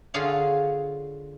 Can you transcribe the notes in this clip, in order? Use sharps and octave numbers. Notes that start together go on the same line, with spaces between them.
D3 F4 G#4 C#5 F5